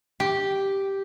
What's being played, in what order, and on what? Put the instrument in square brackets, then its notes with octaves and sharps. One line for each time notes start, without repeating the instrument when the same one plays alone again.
[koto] G4